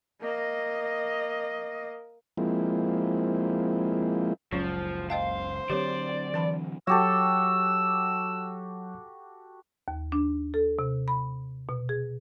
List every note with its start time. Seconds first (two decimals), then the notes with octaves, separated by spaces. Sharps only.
0.21 A#3 D#5
2.37 F3 G#3 A#3 C4 E4
4.53 F#1 C#2 C#3 F3 F#3 C#4
5.10 C5 D#5 F5 G5 A5
5.70 D3 F#3 C4 G4 B4 C#5 D5
6.34 E3 A5 B5
6.87 F#3 F#4 G4 A4 C#5 E6
9.88 D#2
10.12 D4
10.54 A4
10.79 C3
11.08 B5
11.69 B2
11.89 G#4